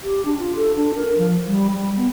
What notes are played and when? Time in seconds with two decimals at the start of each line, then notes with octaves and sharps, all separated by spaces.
0.04 G4
0.25 D4
0.39 F4
0.56 A4
0.76 D4
0.95 A#4
1.18 F3
1.47 G3
1.72 G3
1.96 B3